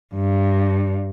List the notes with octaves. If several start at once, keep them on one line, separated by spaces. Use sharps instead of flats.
G2